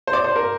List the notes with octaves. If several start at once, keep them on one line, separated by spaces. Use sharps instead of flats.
C5
D5
C5
A#4